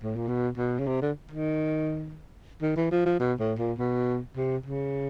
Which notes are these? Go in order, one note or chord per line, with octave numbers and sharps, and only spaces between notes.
A2
A#2
B2
B2
C#3
C3
D3
D#3
D#3
E3
F3
F3
B2
A2
A#2
B2
C3
C#3